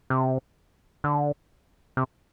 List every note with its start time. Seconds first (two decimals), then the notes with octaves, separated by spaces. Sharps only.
0.10 C3
1.04 D3
1.97 C3